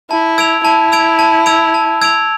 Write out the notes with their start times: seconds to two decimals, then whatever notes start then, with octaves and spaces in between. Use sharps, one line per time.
0.10 E4 A5
0.38 E6 G#6 D7 F7
0.64 E4 A5
0.92 E6 G#6 D7 F7
1.19 A5
1.46 E6 G#6 D7 F7
1.74 A5
2.01 E6 G#6 D7 F7